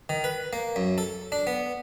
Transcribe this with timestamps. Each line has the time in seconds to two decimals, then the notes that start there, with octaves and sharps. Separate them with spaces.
0.09 D#3
0.24 B4
0.53 A#3
0.76 F#2
0.98 A4
1.32 D4
1.47 B3